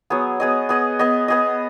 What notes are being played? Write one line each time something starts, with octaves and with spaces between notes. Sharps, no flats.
F#3 B3 G#4
B3 G#4 D#5
B3 G#4 D#5
B3 G#4 D#5
B3 G#4 D#5